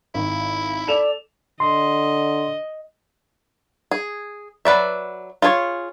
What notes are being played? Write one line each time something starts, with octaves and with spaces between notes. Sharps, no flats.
G#1 D#3 E4
A4 D5 E7 F7
D3 D#5 C6
G#4
F#3 B4 D5 E5
F4 G#4 A4 C#5